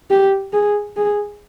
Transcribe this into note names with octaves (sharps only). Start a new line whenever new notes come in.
G4
G#4
G#4